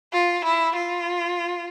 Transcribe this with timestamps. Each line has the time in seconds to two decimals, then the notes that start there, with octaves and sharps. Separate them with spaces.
0.13 F4
0.45 E4
0.75 F4